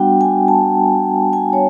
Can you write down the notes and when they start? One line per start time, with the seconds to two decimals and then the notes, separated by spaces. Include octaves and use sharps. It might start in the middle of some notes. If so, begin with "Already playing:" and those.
Already playing: G3 B3 D4 F#4 F#5 G5
0.21 G#5
0.48 A5
1.33 G#5
1.53 C#5